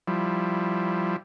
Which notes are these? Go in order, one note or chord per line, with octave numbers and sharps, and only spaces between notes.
F3 G3 E4